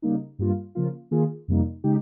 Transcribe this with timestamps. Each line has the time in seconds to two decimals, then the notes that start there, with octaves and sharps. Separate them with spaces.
0.02 C#3 G3 A#3 D#4
0.39 G2 G3 A#3 F4
0.75 C#3 F3 A#3 F4
1.11 D#3 A#3 F4 G#4
1.48 F2 C3 G3 A#3 D#4
1.84 C#3 G#3 D#4 G4